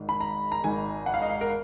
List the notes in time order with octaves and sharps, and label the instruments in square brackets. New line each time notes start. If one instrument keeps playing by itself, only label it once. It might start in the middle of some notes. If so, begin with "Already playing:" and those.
Already playing: [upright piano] G#1 G#2 D#3
B5
A#5
A#5
G#1 G#2 D#3 G#5
F#5
F5
D#5
F5
A#4